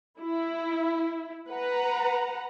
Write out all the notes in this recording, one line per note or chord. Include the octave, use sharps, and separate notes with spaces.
E4
B4 F#5 A#5